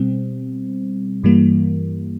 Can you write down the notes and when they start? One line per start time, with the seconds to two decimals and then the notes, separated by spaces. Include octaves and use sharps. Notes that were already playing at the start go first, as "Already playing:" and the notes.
Already playing: B2 G3 C4
1.23 G2 E3 G3 A#3